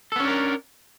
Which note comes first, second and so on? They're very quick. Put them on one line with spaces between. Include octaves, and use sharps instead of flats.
A4 B3 C#4 D4 A#4